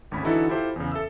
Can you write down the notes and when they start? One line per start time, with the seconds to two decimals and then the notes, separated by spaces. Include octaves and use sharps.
0.11 G#1 D2 C#4 B5
0.23 D3 E3 D#4 E4 F#4 A4
0.49 E4 F4 G4 A4 C5 G5
0.76 E2 C#3
0.92 A4 E5 E6